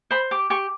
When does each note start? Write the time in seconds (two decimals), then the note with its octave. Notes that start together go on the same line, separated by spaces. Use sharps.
0.11 C5 B5
0.31 G4 D6
0.50 G4 C#6